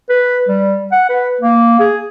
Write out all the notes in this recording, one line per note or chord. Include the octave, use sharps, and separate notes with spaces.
B4
G3
F#5
B4
A#3
G#4